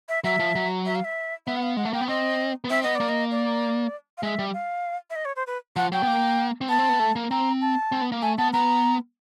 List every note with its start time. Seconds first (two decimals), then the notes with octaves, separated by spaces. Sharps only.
0.09 E5
0.24 F#3 E5
0.39 F3
0.55 F#3
0.86 E5
0.95 F5
1.04 E5
1.47 B3 E5
1.56 F#5
1.63 F5
1.77 G#3 F#5
1.85 A3
1.93 A#3 G5
2.01 B3
2.08 C4 D#5
2.64 B3
2.70 C4 E5
2.83 B3 D#5
2.95 A#3 D5
3.09 D#5
3.31 D5
4.18 F5
4.23 G#3 E5
4.39 G3
4.54 F5
5.10 E5
5.16 D#5
5.25 C#5
5.36 C5
5.47 B4
5.76 F3 F#5
5.92 F#3 G5
6.03 B3
6.07 A#3
6.61 C4
6.69 B3 A5
6.79 C4
6.89 B3
6.99 A3
7.16 A#3
7.31 C4 A#5
7.61 A5
7.92 C4
8.01 B3
8.12 A#3
8.22 A3 G#5
8.38 B3 A5
8.53 B3 A#5